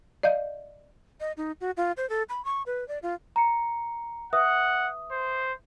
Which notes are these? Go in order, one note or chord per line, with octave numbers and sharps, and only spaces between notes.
D5 D#5 F5 G6
D#5
D#4
F#4
F4
C5
A4
B5
C#6
B4
D5
F4
A#5 C#7
B4 E5 F#5 D#6
C5